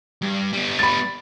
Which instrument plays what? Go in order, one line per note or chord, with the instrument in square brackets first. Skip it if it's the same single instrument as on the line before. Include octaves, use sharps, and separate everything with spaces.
[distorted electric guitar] G2
G3 B3
[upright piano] B5 A6